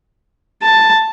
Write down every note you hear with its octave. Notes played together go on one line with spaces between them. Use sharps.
A5